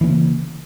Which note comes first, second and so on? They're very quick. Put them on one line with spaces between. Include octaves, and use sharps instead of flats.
E3 B3 C#3 A#3